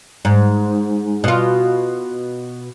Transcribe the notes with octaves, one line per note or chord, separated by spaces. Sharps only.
G#2
B2 F4